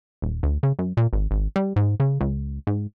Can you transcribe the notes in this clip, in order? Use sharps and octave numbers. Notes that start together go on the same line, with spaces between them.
D#1
D2
C#3
F#2
A#2
G#1
G#1
G3
G#2
C#3
C#2
G#2